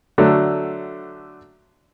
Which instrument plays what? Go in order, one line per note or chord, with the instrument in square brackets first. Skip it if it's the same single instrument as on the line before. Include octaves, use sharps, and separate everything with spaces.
[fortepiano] D3 F#3 A3